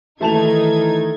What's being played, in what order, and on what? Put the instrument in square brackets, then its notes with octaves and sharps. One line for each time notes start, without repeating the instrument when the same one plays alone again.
[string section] D#3 D#4 G#6 [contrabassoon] E3 [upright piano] A3 A5 F7